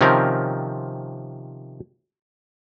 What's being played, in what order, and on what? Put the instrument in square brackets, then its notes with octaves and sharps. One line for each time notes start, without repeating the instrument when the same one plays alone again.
[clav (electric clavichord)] C3 D#3 F3 C4 C#4 A#4